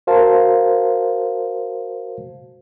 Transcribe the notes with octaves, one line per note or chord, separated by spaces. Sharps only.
F#4 A#4 C5 F5 A5